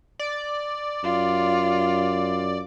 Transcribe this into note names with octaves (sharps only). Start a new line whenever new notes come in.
D5
F#2 F4